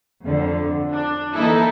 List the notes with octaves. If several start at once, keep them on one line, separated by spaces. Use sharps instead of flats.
F2 D3
D4
E3 A#3 D#4 E4 A4